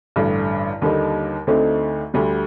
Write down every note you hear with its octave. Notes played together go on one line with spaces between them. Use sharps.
A1 G2 D3
D#2 D3 G3 A#3 D#4
D2 D3 A3 C4 D#4
D2 D3 G3